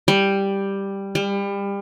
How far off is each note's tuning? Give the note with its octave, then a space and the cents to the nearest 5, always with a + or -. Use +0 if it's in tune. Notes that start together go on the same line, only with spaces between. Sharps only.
G3 +5
G3 +30